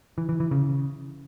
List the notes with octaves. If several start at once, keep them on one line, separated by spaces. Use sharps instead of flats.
E3
E3
E3
C#3